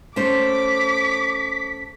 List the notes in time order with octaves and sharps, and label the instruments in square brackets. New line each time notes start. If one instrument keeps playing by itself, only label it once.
[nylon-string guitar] A3 C#4 C5 [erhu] D6 [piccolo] B6